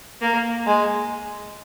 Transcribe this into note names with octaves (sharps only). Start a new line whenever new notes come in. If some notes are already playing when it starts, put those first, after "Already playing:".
A#3
G#3